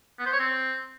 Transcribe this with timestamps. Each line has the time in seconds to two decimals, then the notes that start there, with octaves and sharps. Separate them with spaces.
0.19 B3
0.26 C5
0.33 C#5
0.39 C4